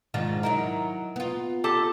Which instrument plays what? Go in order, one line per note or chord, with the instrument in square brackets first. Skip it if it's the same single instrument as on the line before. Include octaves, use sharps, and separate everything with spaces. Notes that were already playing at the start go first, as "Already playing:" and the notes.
[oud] G#2 D#3 D4 [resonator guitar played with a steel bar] F4
[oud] F#3 D#4 E4 [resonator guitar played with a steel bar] A#4
[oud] B3 F4
[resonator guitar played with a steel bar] G4 A4 A5